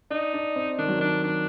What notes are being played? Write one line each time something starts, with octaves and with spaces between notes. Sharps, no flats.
D4 D#4
D4
C4
D#3 D4
F#3
D#3 D4
D4